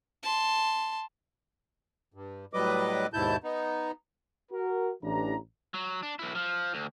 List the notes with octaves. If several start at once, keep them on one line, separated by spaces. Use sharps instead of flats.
A5 C6
G2
A2 F#3 G3 B4 D#5 D6
D#2 G#2 B2 E4 A5 G6
B3 D#4
F#4 A#4
A1 E3 D4 G4 A#5
F#3
D4
B1 E4
F3
D2